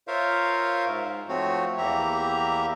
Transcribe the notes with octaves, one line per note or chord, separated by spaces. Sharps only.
F4 A#4 C5 C#5 E5 F5
G#2
F3 A3 C4 F#4 C#5
E2 A#3 G4 E5 A#5